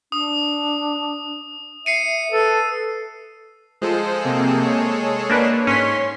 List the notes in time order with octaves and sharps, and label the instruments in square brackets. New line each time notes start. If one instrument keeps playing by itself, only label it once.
[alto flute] D4 [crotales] D#6
[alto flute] E5 [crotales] C7 C#7 D#7
[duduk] A4 [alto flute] B4
[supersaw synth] F3 C5 [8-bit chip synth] G#3 G#4 A4
[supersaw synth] C3 A#3 C4
C#5
[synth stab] A#3 D4 B4
[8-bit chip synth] G#2 C6 C7 [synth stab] C#4 B6